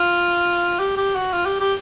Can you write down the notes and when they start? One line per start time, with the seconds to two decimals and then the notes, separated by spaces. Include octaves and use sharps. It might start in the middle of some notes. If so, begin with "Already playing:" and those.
Already playing: F4
0.79 G4
0.97 G4
1.15 F#4
1.33 F4
1.46 G4
1.60 G4